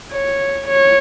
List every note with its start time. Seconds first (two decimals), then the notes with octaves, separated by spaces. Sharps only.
0.13 C#5
0.68 C#5